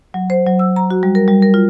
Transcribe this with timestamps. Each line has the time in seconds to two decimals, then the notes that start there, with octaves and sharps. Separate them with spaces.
0.14 F#3
0.30 C5
0.46 F#3
0.59 E6
0.76 A#5
0.91 F#4
1.03 G3
1.15 A#4
1.28 G3
1.42 A#4
1.54 F4